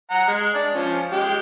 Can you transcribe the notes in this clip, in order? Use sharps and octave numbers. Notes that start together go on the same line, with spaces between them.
F#5 A#5
G#3
D4 D5
F3 C#4
G#3 G4